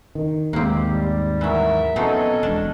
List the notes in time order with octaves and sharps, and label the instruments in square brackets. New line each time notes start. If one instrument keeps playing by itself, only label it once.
[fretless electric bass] D#3
[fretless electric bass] D#2 G#2 [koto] A#3 C4 [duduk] G4
[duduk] G3
[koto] E3 F#3 [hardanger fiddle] A#4 E5
[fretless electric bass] B2 [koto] F#3 C4 D#4 [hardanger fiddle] C#4 D#5 [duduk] A4
[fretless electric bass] E1 [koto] D4